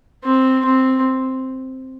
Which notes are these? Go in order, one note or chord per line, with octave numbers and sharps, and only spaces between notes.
C4
C4